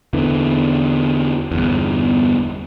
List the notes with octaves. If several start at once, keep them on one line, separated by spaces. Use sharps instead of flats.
E2 D3 E3
G1 E2